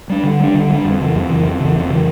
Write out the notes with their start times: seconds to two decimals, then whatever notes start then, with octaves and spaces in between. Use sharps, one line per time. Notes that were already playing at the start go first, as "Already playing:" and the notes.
0.10 G3 D4
0.24 D3
0.40 G3 D4
0.55 D3
0.69 G3 D4
0.84 F2
1.00 C#3 E3
1.16 F2
1.30 C#3 E3
1.45 F2
1.60 C#3 E3
1.76 F2
1.90 C#3 E3